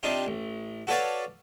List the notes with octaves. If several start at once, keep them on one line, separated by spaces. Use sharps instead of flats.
C3 C4 D4 D#4 F4
A1
F#4 A4 B4 C#5 D5 F5